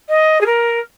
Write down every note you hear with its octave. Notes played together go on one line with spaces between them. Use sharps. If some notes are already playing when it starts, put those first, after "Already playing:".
D#5
G#4
A#4